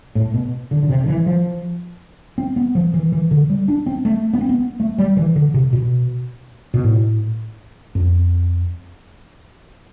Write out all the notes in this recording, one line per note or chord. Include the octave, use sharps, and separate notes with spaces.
A2
B2
D3
D3
C3
D3
E3
F3
C4
B3
F3
E3
E3
D3
G3
D4
C4
A3
B3
C4
B3
A3
G3
E3
D3
C3
B2
B2
A2
F2